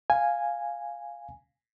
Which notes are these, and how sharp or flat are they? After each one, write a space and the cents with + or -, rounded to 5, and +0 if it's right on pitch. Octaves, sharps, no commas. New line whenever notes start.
F5 +0 G#5 -5